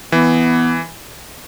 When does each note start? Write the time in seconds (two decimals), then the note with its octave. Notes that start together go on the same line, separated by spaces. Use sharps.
0.12 E3 B3